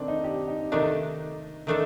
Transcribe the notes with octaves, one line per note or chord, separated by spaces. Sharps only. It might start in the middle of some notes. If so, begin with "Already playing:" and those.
Already playing: D#3 A3 C4 D4
D#4
G4
D#4
C3 D#3 A3 D4 D#4
D#3 A3 D4 D#4 A4